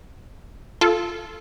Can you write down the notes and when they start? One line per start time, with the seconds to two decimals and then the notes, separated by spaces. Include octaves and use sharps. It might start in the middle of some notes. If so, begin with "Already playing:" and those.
0.81 F4 A4